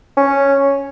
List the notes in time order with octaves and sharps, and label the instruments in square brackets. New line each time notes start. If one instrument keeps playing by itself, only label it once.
[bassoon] C#4